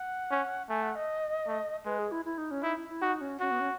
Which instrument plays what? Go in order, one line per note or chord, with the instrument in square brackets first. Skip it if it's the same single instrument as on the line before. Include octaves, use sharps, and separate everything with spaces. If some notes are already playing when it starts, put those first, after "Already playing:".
Already playing: [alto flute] F#5
[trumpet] C#4
[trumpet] A3 [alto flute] G#5
[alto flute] F#5
D#5
[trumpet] A3
[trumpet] G#3 [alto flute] B4
[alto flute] G#4
E4
E4
D#4
C#4
[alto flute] D#4 [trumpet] E4
[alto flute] E4
E4
[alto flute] D#4 [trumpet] F#4
[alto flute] C#4
[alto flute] C#4 [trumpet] F#4
[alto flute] B3
C#4